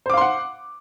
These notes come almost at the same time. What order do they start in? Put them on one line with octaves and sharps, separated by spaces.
C5 D6 F5 C6 F#5